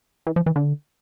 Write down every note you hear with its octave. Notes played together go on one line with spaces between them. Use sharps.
E3
F3
E3
D3